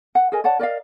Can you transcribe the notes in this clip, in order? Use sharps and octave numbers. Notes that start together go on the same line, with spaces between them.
F#5
G#4 A#4 D#5 G#5
C#5 D5 F#5 A5
A#4 D5 D#5 F5